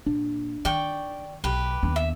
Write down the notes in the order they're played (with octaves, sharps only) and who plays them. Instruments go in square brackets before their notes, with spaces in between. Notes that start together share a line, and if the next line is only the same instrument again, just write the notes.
[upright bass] A#2 [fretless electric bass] D4
[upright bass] D#3 [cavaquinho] D5 G5 C#6
[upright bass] B1 [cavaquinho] G4 B4
[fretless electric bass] D#2 [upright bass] B3 D4
[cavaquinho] E5